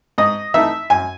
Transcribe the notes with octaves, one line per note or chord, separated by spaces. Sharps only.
G#2 D#5
E3 A3 D#4 E5
F#2 G#5